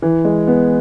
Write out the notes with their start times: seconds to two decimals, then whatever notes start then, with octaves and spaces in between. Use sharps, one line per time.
0.02 E3
0.25 G#3
0.47 B3